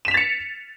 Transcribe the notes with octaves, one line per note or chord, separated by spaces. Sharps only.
A6 B6 C#7 E7 F7